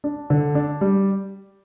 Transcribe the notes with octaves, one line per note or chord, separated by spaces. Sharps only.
D4
D3
D4
G3